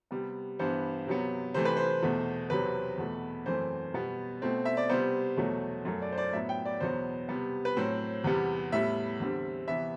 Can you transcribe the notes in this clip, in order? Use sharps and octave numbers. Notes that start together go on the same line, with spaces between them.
C3 G3 B3
G2 E3 B3 C5
C3 F#3 B3
C3 E3 A3 C4 C5
B4
C5
E2 B2 A3
E2 C3 F#3 C4 B4
E2 B2 A3
F#2 E3 A3 C4 C5
B2 G3 B3
B2 A3 C4
E5
D5
C3 G3 B3 C5
E2 B2 F#3 A3
F#2 F#3 A3
D5
C5
D5
A2 F#3 B3 E5
G5
D5
E2 B2 F#3 B3 C5
C3 G3 B3
B4
A2 F#3 C4 C5
E2 C3 G3 B3
A2 G3 B3 E5
E2 D3 G3 C4
C3 E3 B3 E5